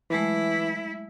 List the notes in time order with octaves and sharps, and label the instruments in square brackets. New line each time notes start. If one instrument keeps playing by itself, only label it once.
[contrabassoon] E3 [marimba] F#3 G#3 A3 [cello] E4